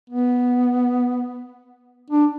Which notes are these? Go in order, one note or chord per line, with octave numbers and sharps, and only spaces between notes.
B3
D4